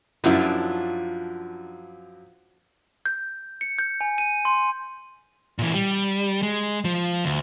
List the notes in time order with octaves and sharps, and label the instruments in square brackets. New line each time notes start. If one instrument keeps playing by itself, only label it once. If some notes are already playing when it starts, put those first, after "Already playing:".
[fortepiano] F#2 E4 F4 [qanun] F3 F#3 D4
[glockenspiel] G6
C#7
G6
G#5
D#7
C6
[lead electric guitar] A#2 E3
G3
G#3
F3
D2